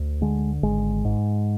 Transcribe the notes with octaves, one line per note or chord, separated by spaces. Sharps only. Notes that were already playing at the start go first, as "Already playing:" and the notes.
Already playing: D2
D3 G#3
G#1 G#3
G#2